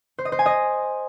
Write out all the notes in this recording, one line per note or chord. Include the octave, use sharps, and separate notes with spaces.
C5
D#5
C5
G#5
D#5